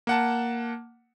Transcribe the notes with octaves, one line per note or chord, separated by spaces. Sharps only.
A#3 F#5 A5